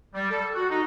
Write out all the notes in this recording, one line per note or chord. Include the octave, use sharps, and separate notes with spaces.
G3
A4
F#4
D#4